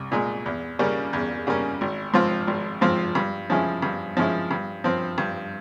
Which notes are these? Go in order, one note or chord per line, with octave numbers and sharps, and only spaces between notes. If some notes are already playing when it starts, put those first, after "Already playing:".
Already playing: C2
A#2 G#3
E2
C#3 G3 A#3 C#4
E2
C#3 G3 A#3 C#4
G#1
G#2 F3 C4 F4
G#1
G#2 F3 C4 F4
G2
F3 G#3 C#4 E4
G2
F3 G#3 C#4 E4
G2
F3 C4
G2